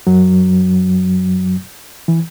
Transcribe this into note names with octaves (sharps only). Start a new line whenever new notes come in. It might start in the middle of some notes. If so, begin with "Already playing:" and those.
F#2 F#3
E3